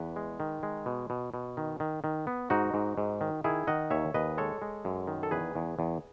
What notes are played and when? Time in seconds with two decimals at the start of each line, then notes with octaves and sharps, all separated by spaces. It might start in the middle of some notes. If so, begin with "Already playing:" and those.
Already playing: E2 B4
0.16 G#3
0.40 D#3
0.63 G#3
0.86 B2
1.10 B2
1.34 B2
1.57 D#3
1.80 D#3
2.04 D#3
2.27 B3
2.50 G#2 D#4 F#4
2.74 G#2
2.98 G#2
3.21 D#3
3.44 D#3 E4 G#4
3.67 D#3 D#5 F#5
3.91 D#2 C#5 E5
4.14 D#2 B4 D#5
4.38 G#3 A4 C#5
4.62 G#3
4.85 F#2
5.08 D#3
5.23 A4
5.31 E2 G#4 B4
5.55 E2
5.79 E2